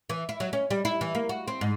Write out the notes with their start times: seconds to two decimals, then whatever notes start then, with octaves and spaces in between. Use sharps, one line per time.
0.10 E3
0.29 E4
0.40 F#3
0.53 C#4
0.70 G3
0.85 E4
1.01 E3
1.15 A#3
1.29 F#4
1.48 C4
1.61 G#2